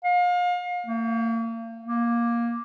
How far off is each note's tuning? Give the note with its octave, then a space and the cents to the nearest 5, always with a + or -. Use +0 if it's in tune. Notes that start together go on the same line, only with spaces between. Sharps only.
F5 +35
A#3 -40
A#3 +15